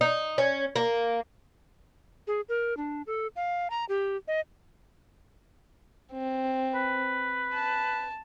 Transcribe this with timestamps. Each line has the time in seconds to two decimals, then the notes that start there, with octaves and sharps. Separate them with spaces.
0.01 D#4
0.38 C#4
0.76 A#3
2.27 G#4
2.49 A#4
2.77 D4
3.07 A4
3.36 F5
3.70 A#5
3.89 G4
4.28 D#5
6.13 C4
6.75 B4
7.54 A5